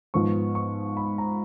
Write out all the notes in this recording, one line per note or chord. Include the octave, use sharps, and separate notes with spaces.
G#2 F3 B3 C#6
C#6
B5
A#5